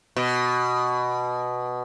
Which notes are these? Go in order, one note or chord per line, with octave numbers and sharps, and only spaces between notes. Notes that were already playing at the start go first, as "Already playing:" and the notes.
B2